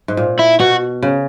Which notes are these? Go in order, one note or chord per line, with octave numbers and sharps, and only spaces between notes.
G#2
A#2
E4
B2 F#4
C#3